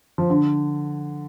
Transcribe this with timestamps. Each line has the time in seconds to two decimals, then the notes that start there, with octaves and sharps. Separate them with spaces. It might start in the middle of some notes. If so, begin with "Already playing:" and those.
0.18 F3
0.30 D3